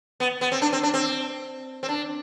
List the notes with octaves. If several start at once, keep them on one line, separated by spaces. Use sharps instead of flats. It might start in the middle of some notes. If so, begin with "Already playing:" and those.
B3
B3
C4
D4
C4
D4
C4
C4
D4